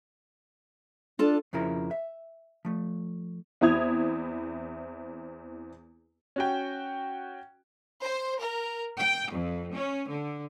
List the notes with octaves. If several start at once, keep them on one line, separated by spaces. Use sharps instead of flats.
D4 F4 A4 A5
F2 C#3 F3 E4 A#4
E5
F3 A3
E2 C4 E4 D#6 G#6 F7
C#4 F#4 G5
C5
A#4
G5
F2
C#4
D3